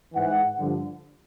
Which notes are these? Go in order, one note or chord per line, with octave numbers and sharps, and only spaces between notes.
G#2 E3 F#5
G2 D3 F3